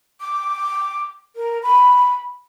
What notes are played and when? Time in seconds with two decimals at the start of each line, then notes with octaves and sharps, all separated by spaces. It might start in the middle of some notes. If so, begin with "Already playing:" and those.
0.21 D6
1.36 A#4
1.63 B5